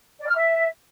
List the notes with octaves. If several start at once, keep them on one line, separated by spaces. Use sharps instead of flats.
D5
F6
E5